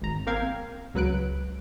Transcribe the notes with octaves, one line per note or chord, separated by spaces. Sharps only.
G#1 A#5
A#3 C4 A#4 F5 G5 G#6
C#2 F#3 B4 F#6 D7